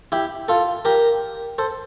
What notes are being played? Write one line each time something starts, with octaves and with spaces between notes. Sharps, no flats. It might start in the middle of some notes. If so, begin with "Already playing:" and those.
E4 G4
F4 A4
G4 A#4
A4 C5